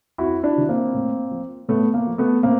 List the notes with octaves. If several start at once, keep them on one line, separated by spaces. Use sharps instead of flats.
F2 E4 F#4
D4 E4
C3 D#3 F#3
A#3 C4
A2
F3
A2 A3 B3
A#3
F3
A3 B3
A2 A#3 C4